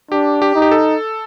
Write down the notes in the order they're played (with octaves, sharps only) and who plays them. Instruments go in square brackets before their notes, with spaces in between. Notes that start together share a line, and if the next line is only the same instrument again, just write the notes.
[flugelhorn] D4 [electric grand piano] G4
[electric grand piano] G4
[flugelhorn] D#4
[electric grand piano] G4
A4